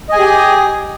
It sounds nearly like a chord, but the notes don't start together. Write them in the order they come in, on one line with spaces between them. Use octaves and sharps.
D#5 G#5 G#4 G4